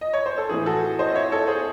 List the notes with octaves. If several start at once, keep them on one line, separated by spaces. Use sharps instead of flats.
D#5
C#5
C5
A4
A2 E3 G#4
F#4 A4
C5 D#5
C#5 E5
A4 C#5
G#4 C5